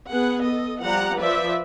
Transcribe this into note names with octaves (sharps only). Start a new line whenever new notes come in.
B3 G#4 F#5
A4 D#5
F3 G3 F#5 A#5
F3 B4 D5 E5